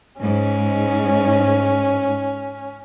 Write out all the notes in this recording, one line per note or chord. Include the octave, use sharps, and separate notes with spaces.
G#2 C#4